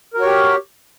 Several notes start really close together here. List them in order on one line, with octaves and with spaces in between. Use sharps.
A#4 F#4 C#5 G4